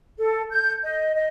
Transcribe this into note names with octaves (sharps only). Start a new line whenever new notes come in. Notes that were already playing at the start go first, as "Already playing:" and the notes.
A4
G6
D#5
D#5